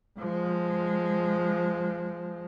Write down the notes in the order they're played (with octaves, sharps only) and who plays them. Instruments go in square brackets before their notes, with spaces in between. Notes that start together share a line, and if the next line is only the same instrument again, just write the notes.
[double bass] F3 G#3